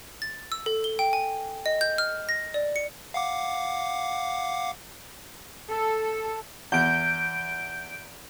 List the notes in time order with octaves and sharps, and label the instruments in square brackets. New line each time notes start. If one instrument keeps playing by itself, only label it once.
[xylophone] A6
E6
A4
G7
G5
G#5
D#5
G6
F6
A#6
D5
C#7
[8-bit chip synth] F5 F#5 D6
[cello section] A4
[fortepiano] E2 [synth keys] G6 D7